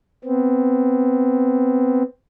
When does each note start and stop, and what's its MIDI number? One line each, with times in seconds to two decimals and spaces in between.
0.25 2.03 59
0.25 2.03 60